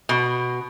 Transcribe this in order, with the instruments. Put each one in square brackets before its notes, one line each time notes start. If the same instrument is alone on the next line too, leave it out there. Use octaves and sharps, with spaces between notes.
[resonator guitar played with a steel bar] B2